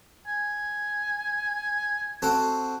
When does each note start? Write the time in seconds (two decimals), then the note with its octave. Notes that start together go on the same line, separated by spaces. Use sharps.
0.27 G#5
2.22 C4 F#4 A4